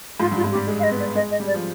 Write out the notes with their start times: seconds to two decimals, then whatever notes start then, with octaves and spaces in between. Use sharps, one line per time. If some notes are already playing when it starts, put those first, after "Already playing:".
0.20 G#2 F4
0.32 G2 F4
0.44 G#2
0.51 G4
0.55 G3
0.67 G#3
0.79 F5
0.83 D#5
0.91 B3
0.99 D5
1.15 G#3 D#5
1.31 D#5
1.40 G3
1.47 D5
1.54 F3